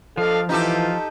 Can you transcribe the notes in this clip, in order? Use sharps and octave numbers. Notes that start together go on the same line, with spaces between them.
F3 D4 A4 D#5 F5
E3 D#4 F4 G4 A4